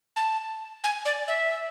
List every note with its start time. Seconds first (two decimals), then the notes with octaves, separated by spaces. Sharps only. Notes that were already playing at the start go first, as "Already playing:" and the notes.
0.16 A5
0.84 G#5
1.05 D5
1.28 E5